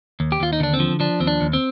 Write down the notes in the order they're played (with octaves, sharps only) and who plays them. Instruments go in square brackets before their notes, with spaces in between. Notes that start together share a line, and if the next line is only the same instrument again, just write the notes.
[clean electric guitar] D#2
G4
D#2 F4
D#4
D3 D4
C4
F3
F3 D4
D#2 C4
D4
D#2
C4